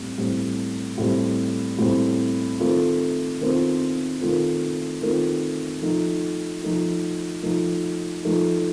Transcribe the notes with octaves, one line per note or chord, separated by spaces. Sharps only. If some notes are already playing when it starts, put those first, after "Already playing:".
Already playing: A2 G3 C4
A2 G3 C4
A2 G3 C4
A2 G3 C4
D#3 A3 C4 F4
D#3 A3 C4 F4
D#3 A3 C4 F4
D#3 A3 C4 F4
F3 A3 D#4
F3 A3 D#4
F3 A3 D#4
F3 A3 D#4